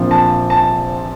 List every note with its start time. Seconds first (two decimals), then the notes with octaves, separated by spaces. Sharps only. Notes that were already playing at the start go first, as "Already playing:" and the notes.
Already playing: A#1 A#2 F3 C4
0.11 A5
0.50 A5